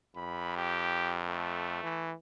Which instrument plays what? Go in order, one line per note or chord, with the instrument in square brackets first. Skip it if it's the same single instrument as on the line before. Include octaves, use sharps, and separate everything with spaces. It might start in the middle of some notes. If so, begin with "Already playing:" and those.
[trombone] F2 [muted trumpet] B5
[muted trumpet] G4
A3
[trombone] E3